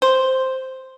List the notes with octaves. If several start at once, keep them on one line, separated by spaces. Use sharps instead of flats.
C5